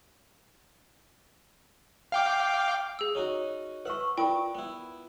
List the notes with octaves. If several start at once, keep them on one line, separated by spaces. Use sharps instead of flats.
F5 G5 D6
G#4 E6
C#4 D#4 F#4
B4 E5 F#5 C#6
D4 F4 A#4 G5 C#6
B3 E4